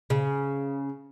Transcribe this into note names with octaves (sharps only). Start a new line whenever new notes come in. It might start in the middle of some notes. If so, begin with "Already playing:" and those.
C#3